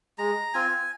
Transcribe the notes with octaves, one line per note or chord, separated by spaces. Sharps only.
G#3 A#5
C4 F4 G#5